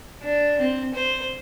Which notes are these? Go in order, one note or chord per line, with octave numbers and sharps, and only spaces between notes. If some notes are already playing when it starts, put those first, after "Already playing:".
D4
C4
C5